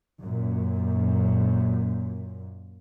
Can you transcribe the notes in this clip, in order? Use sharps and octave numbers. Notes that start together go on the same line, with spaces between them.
F#2 A#2